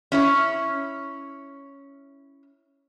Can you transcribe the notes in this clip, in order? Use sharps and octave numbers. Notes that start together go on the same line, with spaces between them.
C#4 E4 C#5